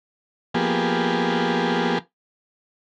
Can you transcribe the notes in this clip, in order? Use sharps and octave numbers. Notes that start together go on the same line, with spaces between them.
F3 A#3 B3 G4 G#4